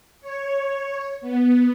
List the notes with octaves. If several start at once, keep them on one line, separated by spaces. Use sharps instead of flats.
C#5
B3